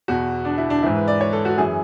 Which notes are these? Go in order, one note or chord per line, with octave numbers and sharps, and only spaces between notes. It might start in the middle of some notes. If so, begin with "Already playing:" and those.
E2 B2 F#4
D4
E4
D4
G#2 E3 E4
B4
D5
C#5
A4
F#4
F#2 E3 G#4